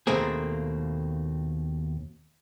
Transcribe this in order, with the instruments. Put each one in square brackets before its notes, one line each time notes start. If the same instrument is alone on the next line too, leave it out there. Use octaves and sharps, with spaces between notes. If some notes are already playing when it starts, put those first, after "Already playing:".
[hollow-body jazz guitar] D#2 B2 A3 A#3 C4 G#4